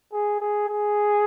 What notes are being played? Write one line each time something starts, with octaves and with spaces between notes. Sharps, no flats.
G#4
G#4
G#4